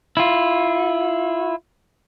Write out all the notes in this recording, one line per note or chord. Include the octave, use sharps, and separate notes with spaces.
E4 F4